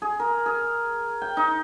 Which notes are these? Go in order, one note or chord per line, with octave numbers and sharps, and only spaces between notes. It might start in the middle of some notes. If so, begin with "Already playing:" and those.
G#4
A#4
G#4
G5
D#4